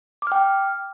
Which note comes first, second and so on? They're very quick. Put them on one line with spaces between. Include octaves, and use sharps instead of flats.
D6 F6 G5